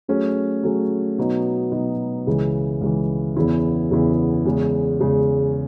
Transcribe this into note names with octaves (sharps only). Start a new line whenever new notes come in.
F#3 A3 C#4 G#4
F#3 A3 C#4 G#4
B2 F#3 B3 D#4
B2 F#3 B3 D#4
C#2 C#3 E3
C#2 C#3 E3
E2 C#3 E3 B3 E4
E2 C#3 E3 B3 E4
E2 C#3 G#3
E2 C#3 G#3